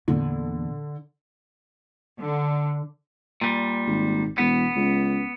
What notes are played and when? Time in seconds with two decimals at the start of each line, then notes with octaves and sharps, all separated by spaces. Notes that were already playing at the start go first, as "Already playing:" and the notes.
0.08 E2 A#2 D3
2.18 D3
3.41 A#2 G3
3.87 G#1
4.38 E1 B3
4.76 C#2